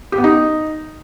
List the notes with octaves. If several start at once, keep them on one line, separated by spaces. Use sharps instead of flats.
G4
B3
D#4